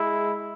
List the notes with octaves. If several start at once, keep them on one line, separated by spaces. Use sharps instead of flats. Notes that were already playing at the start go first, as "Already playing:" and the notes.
Already playing: G#3 E4